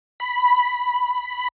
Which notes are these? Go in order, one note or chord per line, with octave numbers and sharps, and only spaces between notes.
B5